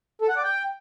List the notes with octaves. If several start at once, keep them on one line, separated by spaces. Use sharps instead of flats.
A4
F#5
D5
G5